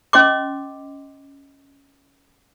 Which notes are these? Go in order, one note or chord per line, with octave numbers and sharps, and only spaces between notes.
C#4 D#5 C6 D6